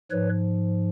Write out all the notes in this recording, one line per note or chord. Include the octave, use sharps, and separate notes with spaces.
G#2 F3 B4 C#5